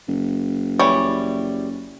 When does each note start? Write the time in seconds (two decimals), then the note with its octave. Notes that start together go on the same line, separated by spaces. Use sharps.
0.08 F#1
0.79 E3 G3 C#5